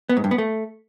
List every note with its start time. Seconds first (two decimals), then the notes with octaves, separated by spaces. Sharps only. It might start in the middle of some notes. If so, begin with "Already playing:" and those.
0.09 B3
0.17 G#2
0.24 G2
0.31 B3
0.38 A3